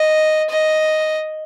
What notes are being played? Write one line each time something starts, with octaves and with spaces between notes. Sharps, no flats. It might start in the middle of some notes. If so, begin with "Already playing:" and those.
Already playing: D#5
D#5